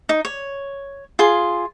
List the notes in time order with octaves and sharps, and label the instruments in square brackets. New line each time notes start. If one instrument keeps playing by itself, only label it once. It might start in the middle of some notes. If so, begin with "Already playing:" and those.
[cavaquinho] D#4
C#5
F4 G#4 C6